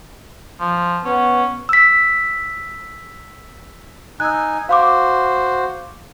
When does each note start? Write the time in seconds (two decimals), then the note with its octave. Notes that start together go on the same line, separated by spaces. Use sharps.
0.60 F3
1.05 B3 C#4
1.69 E6 B6
4.20 D#4 G#5 E6 F#6
4.69 F#4 C5 F5 C6 D6